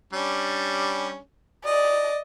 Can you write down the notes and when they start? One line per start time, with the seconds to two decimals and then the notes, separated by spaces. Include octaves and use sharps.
0.13 G3 C#4 D4
1.66 D5 D#5